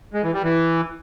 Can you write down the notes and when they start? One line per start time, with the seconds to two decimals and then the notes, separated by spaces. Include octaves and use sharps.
0.14 G#3
0.23 E3
0.33 G3
0.43 E3